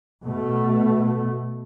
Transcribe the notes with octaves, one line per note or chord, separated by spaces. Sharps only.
B2 A3